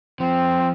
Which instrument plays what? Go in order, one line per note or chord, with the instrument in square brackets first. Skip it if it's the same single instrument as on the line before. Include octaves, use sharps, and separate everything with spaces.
[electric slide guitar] F3 [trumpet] C4